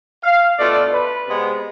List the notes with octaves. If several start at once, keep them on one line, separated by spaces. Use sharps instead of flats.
F5
B2 A3 D4 F4 D5
B4
C3 G#3 B3